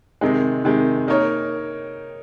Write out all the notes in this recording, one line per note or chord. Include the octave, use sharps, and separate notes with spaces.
C3 D#3 G#3
C3 D#3 G#3
A#3 D#4 A#4 C#5